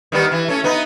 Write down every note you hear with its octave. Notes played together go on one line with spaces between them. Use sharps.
D#3 G3 B3
E3
A3 C#4
B3 D#4